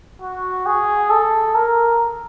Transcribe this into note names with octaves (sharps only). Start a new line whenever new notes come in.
F#4
G#4
A4
A#4